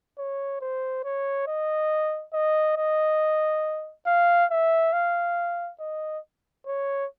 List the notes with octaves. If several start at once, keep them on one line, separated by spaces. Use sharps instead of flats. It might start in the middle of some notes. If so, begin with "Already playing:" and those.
C#5
C5
C#5
D#5
D#5
D#5
F5
E5
F5
D#5
C#5